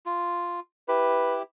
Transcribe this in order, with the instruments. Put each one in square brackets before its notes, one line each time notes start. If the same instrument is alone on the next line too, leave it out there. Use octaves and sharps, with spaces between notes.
[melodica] F4
[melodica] E4 G4 [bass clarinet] B4